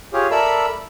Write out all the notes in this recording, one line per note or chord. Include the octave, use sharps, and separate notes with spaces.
F4 G4 G#4 C#5
A4 A#4 D5 E5 B5 E6